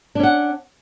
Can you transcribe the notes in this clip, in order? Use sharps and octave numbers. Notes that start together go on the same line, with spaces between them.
C#4 D4 F#5